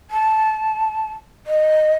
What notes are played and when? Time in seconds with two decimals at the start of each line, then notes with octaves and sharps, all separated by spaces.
0.11 A5
1.47 D#5